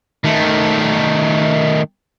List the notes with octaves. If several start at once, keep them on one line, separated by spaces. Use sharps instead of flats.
D#3 A3